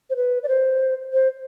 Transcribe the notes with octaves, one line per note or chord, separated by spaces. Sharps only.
C5
B4
D5
C5
C5